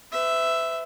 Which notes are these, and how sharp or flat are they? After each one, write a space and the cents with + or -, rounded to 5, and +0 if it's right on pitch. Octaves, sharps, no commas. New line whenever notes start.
B4 +40 E5 +0